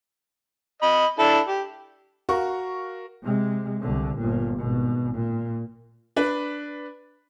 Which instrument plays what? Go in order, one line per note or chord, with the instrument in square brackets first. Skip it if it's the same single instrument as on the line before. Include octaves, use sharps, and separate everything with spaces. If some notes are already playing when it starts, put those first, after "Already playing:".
[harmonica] D#5 B5
D4 E4 A4
G4
[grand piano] F#4 A#4 F5 C#6
[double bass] C3 G#3
C2 D3
G1 A#2
G#1 B2
A#2
[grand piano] D4 B4